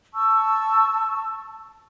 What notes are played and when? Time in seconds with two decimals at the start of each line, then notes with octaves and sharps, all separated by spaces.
0.14 A5 C#6 E6